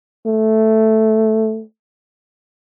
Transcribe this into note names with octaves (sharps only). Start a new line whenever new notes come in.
A3